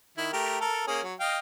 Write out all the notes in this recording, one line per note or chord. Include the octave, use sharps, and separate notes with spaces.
D#3 E4
A3 G4 A#4
A4 A#4
A#3 C#4 G#4
F#3
D#5 F5 G5